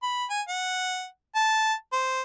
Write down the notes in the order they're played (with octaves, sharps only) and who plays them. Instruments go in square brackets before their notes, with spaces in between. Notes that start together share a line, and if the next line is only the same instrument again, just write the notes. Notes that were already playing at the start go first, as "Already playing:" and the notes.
[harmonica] B5
G#5
F#5
A5
C5